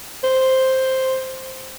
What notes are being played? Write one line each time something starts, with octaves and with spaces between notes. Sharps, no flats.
C5